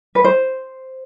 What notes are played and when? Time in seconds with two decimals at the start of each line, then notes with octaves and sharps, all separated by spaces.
0.15 B4
0.24 C5